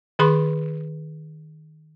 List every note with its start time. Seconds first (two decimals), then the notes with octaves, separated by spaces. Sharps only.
0.19 D#3 G#4 B4 B5 C6